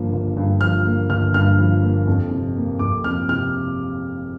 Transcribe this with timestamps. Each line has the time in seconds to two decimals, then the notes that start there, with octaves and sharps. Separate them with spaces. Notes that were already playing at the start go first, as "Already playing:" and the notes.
Already playing: G1 G2 F3 A#3
0.13 G1
0.37 G2
0.61 F3 F6
0.85 A#3
1.09 G1 F6
1.34 G2 F6
1.58 F3
1.82 A#3
2.07 F2
2.31 C3
2.56 A#3
2.79 F2 D6
3.04 F2 F6
3.29 C3 F6